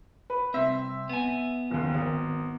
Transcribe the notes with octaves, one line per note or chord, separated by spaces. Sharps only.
B4
C2 C4 E5
B3 G#5
F#1 D#2
G#1